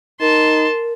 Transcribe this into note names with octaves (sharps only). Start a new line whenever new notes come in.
D#4 A#4 A5 C6